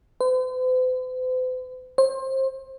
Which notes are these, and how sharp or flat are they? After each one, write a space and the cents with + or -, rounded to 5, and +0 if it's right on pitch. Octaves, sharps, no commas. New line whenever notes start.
C5 -45
C5 +25